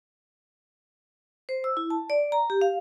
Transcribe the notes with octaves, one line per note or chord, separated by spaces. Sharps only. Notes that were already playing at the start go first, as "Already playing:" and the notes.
C5
E6
E4
A5
D5
A#5
G4
F5